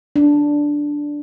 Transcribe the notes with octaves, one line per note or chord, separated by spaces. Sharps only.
D4